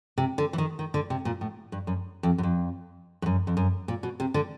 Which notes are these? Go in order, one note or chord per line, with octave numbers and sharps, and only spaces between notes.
C3
D3
E3
D#3
D#3
D3
C3
A#2
A2
G2
F#2
F2
F#2
F2
G2
F#2
F2
F#2
A#2
B2
C3
D3